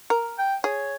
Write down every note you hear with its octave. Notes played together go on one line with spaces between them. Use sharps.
A#4
G5
G#4 C#5